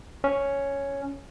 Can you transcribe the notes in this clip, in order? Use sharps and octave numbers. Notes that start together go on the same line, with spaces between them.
C#4